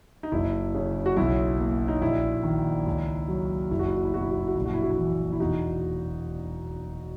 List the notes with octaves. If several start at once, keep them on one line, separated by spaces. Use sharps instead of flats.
D#4
F#1 E4
C#3
F#4
B1 E4
A#3
D#4
A#1 E4
D#3
C#2
F#3
F#1 E4
F#4
E4
F#4
E4
B2 F#4
E4
F#4
E4
F#4
A#1 E4
F#4
E4
F#4
E4
E3
E4
E1 D#4 F#4